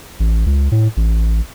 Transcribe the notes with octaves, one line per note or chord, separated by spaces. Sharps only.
A1
C#2
A2
A1